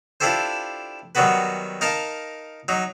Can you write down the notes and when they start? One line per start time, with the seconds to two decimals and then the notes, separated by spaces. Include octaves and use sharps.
0.20 D4 E4 F4 G4 A4 C5
1.15 D#3 F#3 G3 B3 F#4 B4
1.81 D#4 A#4 F5 A5
2.68 F#3 D#4